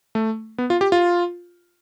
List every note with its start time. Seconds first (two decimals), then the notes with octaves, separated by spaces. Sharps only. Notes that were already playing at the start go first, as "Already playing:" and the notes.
0.15 A3
0.58 B3
0.70 F4
0.81 G4
0.92 F4